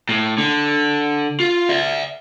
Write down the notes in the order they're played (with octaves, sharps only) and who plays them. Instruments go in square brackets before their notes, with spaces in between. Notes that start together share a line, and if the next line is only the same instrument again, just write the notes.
[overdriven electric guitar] A2
D3
F4
D5 E5